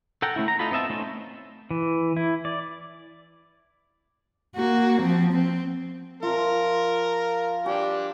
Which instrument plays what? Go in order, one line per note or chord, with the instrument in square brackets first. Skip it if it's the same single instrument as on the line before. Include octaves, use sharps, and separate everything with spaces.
[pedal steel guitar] A4 F#5 G5 A#5
A3 A#3 C#4 E4
A#5
D#4 F4 A4 B5
B3 C4 D#5 E5 A5
A3 C4 C#4 D#4
E3
E4
D5
[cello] A#3 F#4
F3 C4
C4
[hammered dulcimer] F3 F4 [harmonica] A#4
[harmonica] D4 G4 [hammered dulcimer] G#5